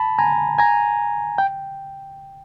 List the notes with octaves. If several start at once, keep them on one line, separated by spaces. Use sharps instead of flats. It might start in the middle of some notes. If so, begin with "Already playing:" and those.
Already playing: A5 B5
G#5 A#5
G#5 A#5
G5